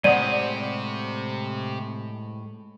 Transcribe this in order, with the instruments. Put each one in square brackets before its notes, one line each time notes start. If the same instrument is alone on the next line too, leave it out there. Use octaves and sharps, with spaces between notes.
[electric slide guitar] A2 G#3 C5 [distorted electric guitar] C3 [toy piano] D5 F#5 D#6 [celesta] D#7